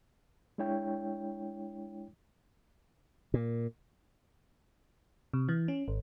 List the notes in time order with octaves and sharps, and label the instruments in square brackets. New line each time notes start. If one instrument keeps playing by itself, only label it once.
[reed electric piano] G#3 D4 E4 C#5 G5
[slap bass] A#2
[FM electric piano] C3
E3
C#4
G#1